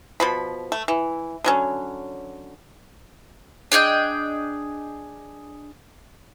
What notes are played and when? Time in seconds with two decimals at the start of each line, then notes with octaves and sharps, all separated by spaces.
0.20 B2 F3 B5
0.72 A3
0.88 E3
1.44 D3 F#3 C#4
3.72 D4 G#4 D#5 G5